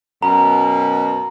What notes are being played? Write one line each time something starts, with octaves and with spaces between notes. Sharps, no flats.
F#2 B2 A#5